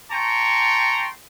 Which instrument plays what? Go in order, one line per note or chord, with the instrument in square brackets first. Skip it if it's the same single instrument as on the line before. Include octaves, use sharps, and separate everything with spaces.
[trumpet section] G5 A5 A#5 C6 C#6